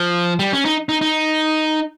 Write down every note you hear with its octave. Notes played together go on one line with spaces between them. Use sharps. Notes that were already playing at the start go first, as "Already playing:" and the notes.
Already playing: F3
G3
C#4
D#4
D#4
D#4